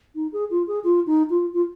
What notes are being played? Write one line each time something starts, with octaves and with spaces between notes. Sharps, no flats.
D#4
G#4
F4
G#4
F4
D#4
F4
F4